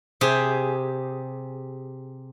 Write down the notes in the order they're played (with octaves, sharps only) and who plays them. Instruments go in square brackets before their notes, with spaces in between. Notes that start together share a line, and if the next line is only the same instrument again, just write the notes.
[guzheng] C3 G4 G#4